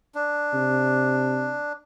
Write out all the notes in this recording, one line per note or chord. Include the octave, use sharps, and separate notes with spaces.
D4
C3